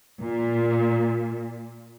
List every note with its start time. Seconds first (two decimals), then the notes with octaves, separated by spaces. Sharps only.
0.22 A#2